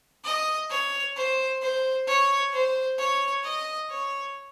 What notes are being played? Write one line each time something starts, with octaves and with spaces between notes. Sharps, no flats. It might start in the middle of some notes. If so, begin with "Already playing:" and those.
D#5
C#5
C5
C5
C#5
C5
C#5
D#5
C#5